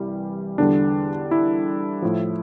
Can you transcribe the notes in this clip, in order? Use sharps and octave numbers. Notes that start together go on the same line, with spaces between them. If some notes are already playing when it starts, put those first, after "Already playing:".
Already playing: C2 E3 G3
E2 D3 G3 D4
E4
A2 F3